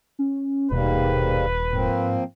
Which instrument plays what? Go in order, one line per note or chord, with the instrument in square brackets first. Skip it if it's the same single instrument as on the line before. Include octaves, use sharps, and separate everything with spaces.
[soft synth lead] C#4
[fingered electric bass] D#1 [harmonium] G#2 G3 A#3 [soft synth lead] B2 [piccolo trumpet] B4
[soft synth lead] G#2 [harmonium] F3 A#3 C4